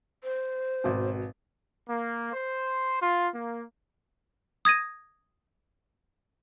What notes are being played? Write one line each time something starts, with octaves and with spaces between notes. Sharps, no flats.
C5
G#1 B2
A#3
C5
F4
A#3
D#6 G#6 A#6 D#7